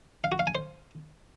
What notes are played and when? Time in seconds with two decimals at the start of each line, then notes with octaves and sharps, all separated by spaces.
0.24 F5
0.32 F#4
0.39 F5
0.47 G#5
0.55 C5